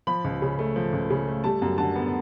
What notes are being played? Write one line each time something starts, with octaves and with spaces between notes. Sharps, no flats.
F3 B5
C#2
C#3
A3
F3
C#2
C#3
A3
G3 A5
F#2
D3 A5
B3